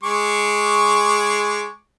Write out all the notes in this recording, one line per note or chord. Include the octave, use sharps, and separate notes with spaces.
G#3 C#6 D6